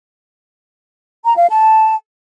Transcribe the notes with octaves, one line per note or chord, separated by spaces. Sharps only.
A#5
F5
A5